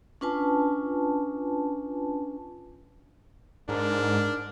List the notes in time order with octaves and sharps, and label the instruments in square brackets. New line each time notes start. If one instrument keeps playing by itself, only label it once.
[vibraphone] C#4 D4 F4 B4 G#5 A5
[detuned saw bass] G#2 [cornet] D4 [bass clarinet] A#4